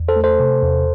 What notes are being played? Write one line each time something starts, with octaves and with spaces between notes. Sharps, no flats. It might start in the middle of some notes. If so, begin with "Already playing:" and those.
Already playing: E2
A4 C5
A3
A4 C5
C3
E2